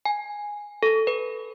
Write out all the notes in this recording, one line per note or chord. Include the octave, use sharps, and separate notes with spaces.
G#5
A4
B4